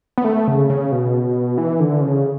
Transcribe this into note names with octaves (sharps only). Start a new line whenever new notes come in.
B3
A3
C#3
C#3
B2
E3
D3
C#3